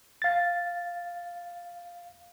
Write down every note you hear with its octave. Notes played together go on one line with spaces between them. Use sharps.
F5 A6